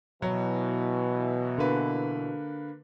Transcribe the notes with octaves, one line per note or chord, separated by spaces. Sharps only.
B2 E3 F#3
D3 A#3 B4